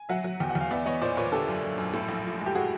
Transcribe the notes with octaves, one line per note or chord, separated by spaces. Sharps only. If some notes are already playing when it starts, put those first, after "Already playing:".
Already playing: G#5
F#3 E5 F#5
F#3
E2 G5
F#5
E2
F5
B3 D5 E5
B3 C#5 D#5
A#2 C5 D5
A#2 B4 C#5
D3 G4 A4
F#2
F#2
F#2
A2
A#1
F3
G#3
G4
F#4 G#4